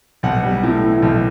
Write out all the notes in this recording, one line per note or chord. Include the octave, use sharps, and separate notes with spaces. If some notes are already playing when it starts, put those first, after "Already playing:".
B1 F#5
G3
A2
E3
B1